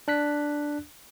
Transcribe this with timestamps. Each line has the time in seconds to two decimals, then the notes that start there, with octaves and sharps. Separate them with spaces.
0.08 D4 F#6 B6